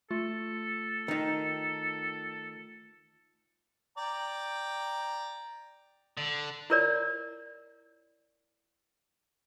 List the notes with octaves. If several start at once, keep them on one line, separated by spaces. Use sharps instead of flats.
A3 F4 A4
D#3 D#4
D5 G5 A#5
D3
E4 F4 A#4 C#5 D5